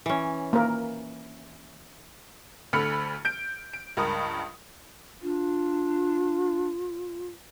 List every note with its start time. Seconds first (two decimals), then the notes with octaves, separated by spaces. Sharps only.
0.06 E3 C#4
0.53 A#3 A#4
2.73 D2 D3 A3 B5 F6 C#7
3.25 G6 D7
3.73 D7
3.97 C#2 G2 A#4 D#6
5.22 D4 F4